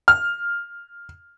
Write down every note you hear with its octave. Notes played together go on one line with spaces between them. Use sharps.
F6